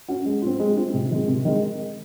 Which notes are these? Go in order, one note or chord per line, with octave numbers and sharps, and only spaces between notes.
C#4 F#4
G#3
C4 F4
G#3
C4 F4
C3
D#3 G#3
C3
D#3 G#3